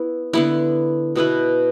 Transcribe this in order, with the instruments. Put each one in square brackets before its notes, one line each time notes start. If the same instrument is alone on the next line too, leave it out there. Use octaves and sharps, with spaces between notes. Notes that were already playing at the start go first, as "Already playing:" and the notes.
Already playing: [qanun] B3 E4
D3 B3 E4
B2 B3 E4 B4